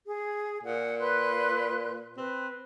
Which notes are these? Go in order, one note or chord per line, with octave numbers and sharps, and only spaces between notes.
G#4
A#2 F#5
B4 C6 F#6
C4 B4